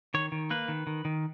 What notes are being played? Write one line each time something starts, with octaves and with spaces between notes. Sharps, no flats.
D#3 C#5
D#3
A#3 B4
D#3
D#3
D#3